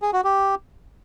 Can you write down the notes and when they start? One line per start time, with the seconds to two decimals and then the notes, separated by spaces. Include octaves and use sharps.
0.02 G#4
0.13 F#4
0.24 G4